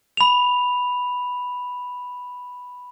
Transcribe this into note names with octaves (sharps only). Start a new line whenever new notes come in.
B5 F7